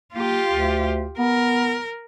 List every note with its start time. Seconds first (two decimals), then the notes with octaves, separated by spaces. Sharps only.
0.14 A#3 F4 G4
0.52 D2
1.18 B3 A#4